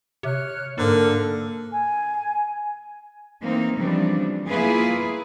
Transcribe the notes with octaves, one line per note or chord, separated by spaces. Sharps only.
C3 C#5 F6 F#6
G#2 D3 A#3 A4 A#4
G#5
E3 A#3 C4 D#4
C#3 E3 F3 G3 C4 D4
A#3 B3 E4 F4 G#4 B4